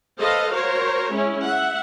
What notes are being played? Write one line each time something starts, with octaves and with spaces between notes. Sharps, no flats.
A4 B4 C5 D#5 F5
F#4 A#4 C5 C#5
G#3 C#4 E4
E5 F#5